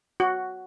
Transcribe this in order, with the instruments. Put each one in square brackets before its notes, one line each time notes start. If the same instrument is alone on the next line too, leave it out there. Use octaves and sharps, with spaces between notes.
[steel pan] F#4